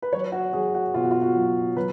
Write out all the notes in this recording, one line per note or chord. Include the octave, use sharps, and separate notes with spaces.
B4
F#3 C#5
F#4
F#3 G#4
F#4
B2 F4
F#4
F4
F#4
F#3
F#3 B4